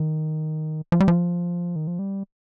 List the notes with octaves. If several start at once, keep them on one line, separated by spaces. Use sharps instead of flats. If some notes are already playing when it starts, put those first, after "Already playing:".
Already playing: D#3
F3
G3
F3
D#3
F3
G3